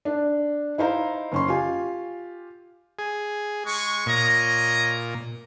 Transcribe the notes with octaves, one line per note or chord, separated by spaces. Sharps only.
D4
D#4 E4 C5 F5 A#5
F#1 C#4 C6
F4 G4 G#5
G#4
G#3 C#6
A#2 C#5 D#5 A#5